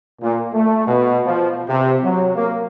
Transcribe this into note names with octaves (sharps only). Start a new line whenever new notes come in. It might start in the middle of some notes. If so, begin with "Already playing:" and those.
A#2
A3
B2
F3
C3
F#3
A#3